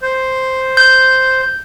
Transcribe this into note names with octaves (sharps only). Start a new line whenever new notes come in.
C5
G6